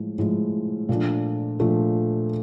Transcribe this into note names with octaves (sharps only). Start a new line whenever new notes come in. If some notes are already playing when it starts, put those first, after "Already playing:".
Already playing: A2 F3 G#3
A2 F3 G#3
A#2 F3 A3 D4
A#2 F3 A3 D4